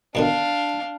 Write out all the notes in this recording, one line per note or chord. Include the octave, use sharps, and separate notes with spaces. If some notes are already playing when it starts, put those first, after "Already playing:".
B2 D3 D#3 D4 F5